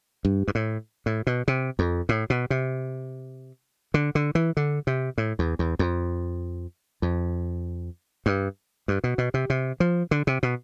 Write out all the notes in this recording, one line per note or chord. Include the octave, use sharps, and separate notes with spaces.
G2
G2
A2
A2
B2
C3
F2
A2
B2
C3
D3
D3
E3
D3
C3
A2
E2
E2
F2
F2
G2
G2
B2
B2
C3
C3
F3
D3
C3
B2